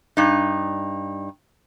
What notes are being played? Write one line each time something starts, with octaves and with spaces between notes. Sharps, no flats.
G2 D#4